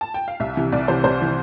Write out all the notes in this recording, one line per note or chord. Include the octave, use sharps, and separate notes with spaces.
A5
G5
F5
C2 E5
C3 E3
C2 D5
C3 E3 C5
C2 C5
C3 E3